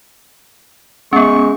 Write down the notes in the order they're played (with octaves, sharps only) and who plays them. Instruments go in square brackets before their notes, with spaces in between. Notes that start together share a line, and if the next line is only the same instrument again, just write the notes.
[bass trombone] G#3 [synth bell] B3 C#4 [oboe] C#6